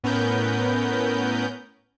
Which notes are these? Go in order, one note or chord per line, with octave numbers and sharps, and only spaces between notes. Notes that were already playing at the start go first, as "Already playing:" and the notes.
A2 B3 C#4 A#4 B4 G6